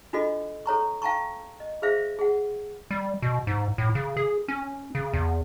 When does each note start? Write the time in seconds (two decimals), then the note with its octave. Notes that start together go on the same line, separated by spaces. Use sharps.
0.13 D4 F4 F#4 A4 D#5
0.66 A4 C#5 A#5 C#6
1.02 F5 G5 A5 A#5 C#6
1.60 D#5
1.82 G#4 B4 C5 E5 F5
2.19 G#4 F#5
2.91 G3
3.22 B2
3.47 G#2
3.78 A2
3.95 C#3
4.17 G#4
4.48 C#4
4.95 C#3
5.13 E2